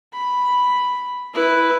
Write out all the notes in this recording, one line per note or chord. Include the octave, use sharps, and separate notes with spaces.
B5
E4 B4